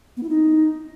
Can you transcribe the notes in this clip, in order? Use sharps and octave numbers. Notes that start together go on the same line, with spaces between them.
B3
E4
D#4